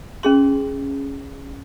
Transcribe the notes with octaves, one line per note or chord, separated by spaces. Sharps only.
C#4 G#4 C6